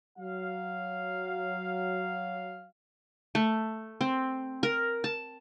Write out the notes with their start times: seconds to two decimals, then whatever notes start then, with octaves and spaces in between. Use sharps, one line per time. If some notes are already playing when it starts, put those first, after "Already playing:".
0.18 F#3 F5
3.35 A3
4.01 C4
4.63 A#4
5.04 A5